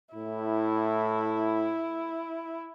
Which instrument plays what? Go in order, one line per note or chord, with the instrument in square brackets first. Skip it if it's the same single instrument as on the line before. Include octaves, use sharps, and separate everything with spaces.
[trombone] A2 [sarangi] E4